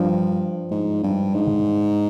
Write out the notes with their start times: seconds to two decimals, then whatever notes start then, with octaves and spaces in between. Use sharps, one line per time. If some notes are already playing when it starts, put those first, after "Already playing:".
Already playing: G2 F3
0.71 G#2
1.03 G2
1.35 G#2